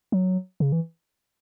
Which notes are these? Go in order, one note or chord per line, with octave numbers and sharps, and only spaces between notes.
F#3
C#3
E3